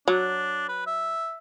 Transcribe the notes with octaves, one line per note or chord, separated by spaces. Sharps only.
F#3 D4
B4
E5